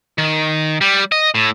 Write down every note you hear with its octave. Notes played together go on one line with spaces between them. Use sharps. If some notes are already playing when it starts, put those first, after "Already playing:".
D#3
G3
D#5
A2